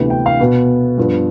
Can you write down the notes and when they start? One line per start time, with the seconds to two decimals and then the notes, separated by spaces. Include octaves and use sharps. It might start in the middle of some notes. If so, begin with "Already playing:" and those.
Already playing: D2 C3 E3 B3
0.10 G5
0.26 F5
0.39 B2 B3
0.98 G2 F3 B3